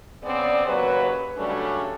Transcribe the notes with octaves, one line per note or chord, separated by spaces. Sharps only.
C#3 B3 C4 G#4 D5
D#2 C#3 F#3 B4
C#3 F#3 G3 A3 C#4 D4